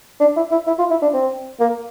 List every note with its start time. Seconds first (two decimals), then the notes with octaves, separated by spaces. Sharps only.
0.20 D4
0.36 E4
0.51 E4
0.67 E4
0.79 F4
0.90 E4
1.02 D4
1.14 C4
1.60 A#3